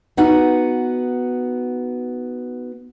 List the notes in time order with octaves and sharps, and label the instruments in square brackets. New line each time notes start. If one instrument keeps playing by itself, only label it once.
[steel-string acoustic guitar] B3 D#4 F#4 F#5